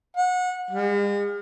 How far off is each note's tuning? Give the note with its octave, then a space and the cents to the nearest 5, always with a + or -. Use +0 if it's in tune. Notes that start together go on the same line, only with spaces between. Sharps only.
F#5 -25
G#3 -45